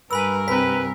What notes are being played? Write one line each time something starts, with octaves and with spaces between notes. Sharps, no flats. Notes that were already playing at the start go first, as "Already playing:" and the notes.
G2 A#4 B4 G#5 B5 E6
C2 C4 B4 B6